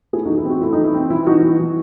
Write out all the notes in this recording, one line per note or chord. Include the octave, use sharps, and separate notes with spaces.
A3 E4 G#4
D#4 F#4
E3
E4
C4 F#4
A3 E4
D#4
E3
E4
C4
E3 E4
E3 D#4 F#4
E3
E3